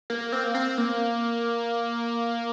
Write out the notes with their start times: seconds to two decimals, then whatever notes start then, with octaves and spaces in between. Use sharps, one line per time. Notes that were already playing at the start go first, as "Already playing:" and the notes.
0.10 A#3
0.32 C4
0.44 A#3
0.55 C4
0.78 A#3